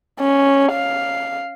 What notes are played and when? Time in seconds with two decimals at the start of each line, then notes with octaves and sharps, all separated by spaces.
0.20 C#4
0.73 F5